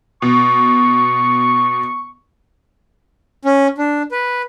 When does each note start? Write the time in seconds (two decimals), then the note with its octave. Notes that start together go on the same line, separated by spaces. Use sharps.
0.22 B2 C#6
3.45 C#4
3.78 D4
4.11 B4